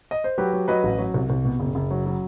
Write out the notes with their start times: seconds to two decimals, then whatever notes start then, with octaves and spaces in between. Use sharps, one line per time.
0.11 D#5
0.24 C5
0.38 F#3 G4 B4
0.53 F#3
0.68 F#3 B4 D#5
0.83 A1
0.98 F#3
1.14 C2
1.30 C2
1.44 B2
1.60 F#1
1.75 F#1
1.91 F#3
2.06 F#3